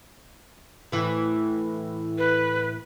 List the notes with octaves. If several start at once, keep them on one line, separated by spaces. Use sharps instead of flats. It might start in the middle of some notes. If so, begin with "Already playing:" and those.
A2 E3
B4